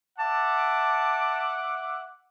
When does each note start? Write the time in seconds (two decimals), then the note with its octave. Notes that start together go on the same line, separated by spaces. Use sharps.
0.19 E5 F#5 A5 D6